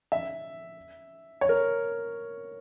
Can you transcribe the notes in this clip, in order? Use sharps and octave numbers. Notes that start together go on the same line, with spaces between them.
E5
C#5
A#4